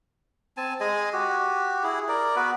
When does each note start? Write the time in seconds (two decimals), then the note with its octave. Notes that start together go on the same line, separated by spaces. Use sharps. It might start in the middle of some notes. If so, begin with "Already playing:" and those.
0.57 C4 G#5 A5
0.80 G#3 G#4 D#5 G#5
1.13 F#4 G4
1.84 E4 G#4
2.08 A#4 D5
2.36 B3 F#4 B4